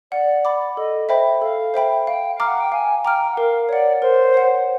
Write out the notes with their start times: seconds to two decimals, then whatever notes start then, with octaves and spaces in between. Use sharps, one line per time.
0.12 D5 F#5
0.45 B5 D6
0.76 A4 D#5
1.09 C5 E5 G5 B5
1.42 A4 F5
1.74 C5 E5 G5 B5
2.07 F5 G5
2.35 F5
2.40 A#5 D6 F6
2.47 F#5
2.60 G5
2.72 F5 G#5
3.04 G5 A#5 D6 F6
3.32 F#5
3.37 A#4 F5
3.69 C#5 D5 F#5
4.01 A#4 C5
4.34 C#5 F#5